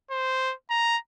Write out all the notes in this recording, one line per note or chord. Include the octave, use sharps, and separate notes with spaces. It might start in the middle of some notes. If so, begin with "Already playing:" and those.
C5
A#5